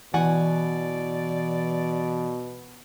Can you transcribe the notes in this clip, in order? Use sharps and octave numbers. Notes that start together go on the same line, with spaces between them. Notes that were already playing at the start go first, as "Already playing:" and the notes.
B2 E3 D5 F#5 G#5 C#6